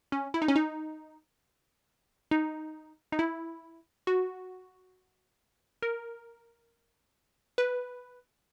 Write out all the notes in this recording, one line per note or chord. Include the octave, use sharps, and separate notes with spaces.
C#4
E4
D#4
C#4
D#4
D#4
D#4
E4
F#4
A#4
B4